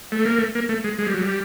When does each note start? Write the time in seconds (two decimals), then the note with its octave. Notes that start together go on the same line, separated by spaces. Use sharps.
0.12 A3
0.25 A#3
0.38 A3
0.55 A#3
0.69 A3
0.84 G#3
0.99 G#3
1.06 G3
1.14 F#3
1.22 G3